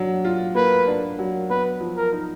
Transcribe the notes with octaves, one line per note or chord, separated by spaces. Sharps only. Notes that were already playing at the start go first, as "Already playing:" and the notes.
Already playing: F#3 D4
F4
A#3 B4
D4
F#3
B3 B4
F3
A#4
D#4